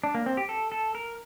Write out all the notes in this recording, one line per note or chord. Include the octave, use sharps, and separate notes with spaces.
D4
A#3
C4
G4
A4
A4
A#4